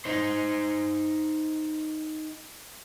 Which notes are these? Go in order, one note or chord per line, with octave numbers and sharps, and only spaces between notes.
D#4 C5